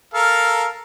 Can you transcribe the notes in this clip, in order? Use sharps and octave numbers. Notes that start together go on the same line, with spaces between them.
A4 A#4 F5